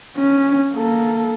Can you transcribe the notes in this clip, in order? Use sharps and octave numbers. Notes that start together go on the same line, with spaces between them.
C#4
A#3 A4